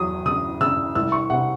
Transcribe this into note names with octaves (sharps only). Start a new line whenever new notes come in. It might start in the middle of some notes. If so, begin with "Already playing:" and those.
Already playing: E2 F#3 D#6
C#3 D#6
C#3 E6
C2 E6
C#6
C3 F#5